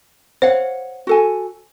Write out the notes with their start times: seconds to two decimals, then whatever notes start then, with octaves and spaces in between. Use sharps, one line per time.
0.42 C5 C#5 F5 F#5
1.07 F#4 A4 G#5